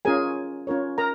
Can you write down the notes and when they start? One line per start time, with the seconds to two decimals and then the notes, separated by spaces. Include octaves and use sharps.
0.05 C#4 F4 G#4 A#4 C#5 G#5
0.67 C#4 F4 A#4 C#5
0.98 A#4 A#5